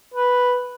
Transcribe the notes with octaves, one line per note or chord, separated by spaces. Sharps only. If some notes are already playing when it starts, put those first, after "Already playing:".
B4